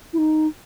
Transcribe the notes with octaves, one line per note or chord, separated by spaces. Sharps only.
E4
D#4